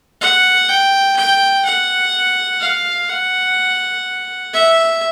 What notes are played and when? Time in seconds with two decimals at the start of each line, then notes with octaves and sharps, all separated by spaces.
0.21 F#5
0.69 G5
1.16 G5
1.65 F#5
2.61 F5
3.09 F#5
4.53 E5